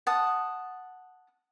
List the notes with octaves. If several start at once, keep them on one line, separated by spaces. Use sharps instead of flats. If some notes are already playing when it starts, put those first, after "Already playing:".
F#5 A5 D#6